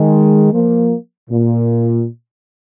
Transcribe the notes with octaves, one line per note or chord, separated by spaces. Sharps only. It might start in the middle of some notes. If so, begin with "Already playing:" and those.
Already playing: D#3 G#3
F3 A#3
A#2